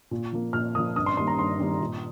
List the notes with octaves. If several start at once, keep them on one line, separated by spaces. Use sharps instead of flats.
A#2
F3 A#3
A#2 F6
F3 A#3 D#6
G2 D#6
C6
D#3 G3 A#3 C6
A#5
G2 C6
D#3 G3 A#3
A#2